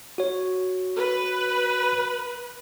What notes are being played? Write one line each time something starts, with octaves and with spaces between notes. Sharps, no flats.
F#4 C#5
B4